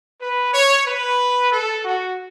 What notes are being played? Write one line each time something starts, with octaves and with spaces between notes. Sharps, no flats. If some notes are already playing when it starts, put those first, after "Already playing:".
B4
C#5
B4
A4
F#4